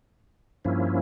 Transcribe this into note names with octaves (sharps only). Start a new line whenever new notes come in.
G2 F3 A#3 C#4 E4